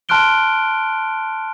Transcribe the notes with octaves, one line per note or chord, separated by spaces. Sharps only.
A5 C6 F6 F#6 D7 G7